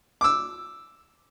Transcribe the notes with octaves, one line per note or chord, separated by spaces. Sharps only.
D6 E6